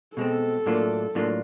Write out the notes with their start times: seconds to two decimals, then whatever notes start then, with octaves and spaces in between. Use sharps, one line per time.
0.16 B2 G#3 C4 A4
0.66 A2 F#3 A#3 D4 F4
1.15 A2 F#3 A#3 D4 F4